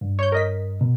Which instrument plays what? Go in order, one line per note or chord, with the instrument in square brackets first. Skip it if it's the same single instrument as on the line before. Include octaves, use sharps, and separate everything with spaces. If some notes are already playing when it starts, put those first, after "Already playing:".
[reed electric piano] G2
[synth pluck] C#5 G6
A#4 D#5 B6
[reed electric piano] B2